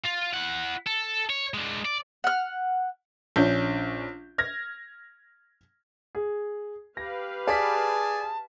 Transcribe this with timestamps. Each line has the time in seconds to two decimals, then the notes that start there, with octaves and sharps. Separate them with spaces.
0.05 F4
0.34 E4 F#5
0.87 A4
1.30 C#5
1.54 G#3 D4
1.85 D5
2.24 F#5 F6
3.36 A#1 C#4 D4 G6
4.38 F6 G#6 A#6
6.15 G#4
6.97 G4 B4 F5 A#6
7.47 G#4 D5 A5 B6